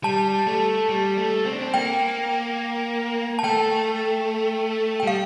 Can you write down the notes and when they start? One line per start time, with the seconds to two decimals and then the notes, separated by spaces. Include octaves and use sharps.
0.04 G3 A5
0.47 A3
0.89 G3
1.18 A3
1.46 C4
1.52 D4
1.61 C4
1.74 A#3 G5
3.39 A5
3.44 A3 G5
5.00 G5
5.03 G3 F5